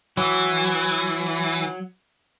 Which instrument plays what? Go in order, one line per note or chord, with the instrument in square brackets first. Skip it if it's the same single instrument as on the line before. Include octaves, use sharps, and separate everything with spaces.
[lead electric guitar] E3 [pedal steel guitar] F#3